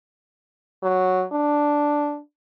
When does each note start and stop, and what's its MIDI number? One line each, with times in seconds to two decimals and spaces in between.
0.83 1.24 54
1.32 2.19 62